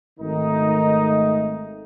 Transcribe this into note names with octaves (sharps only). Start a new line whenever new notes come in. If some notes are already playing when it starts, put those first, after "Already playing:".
G#1 D#3 A3 D#4